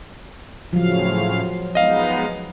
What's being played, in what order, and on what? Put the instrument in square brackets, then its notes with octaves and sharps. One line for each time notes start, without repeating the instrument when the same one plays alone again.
[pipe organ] A2 C#3 F5 [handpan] F3 F#3
[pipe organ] G#3 B3 D#4 [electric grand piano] D#5 F5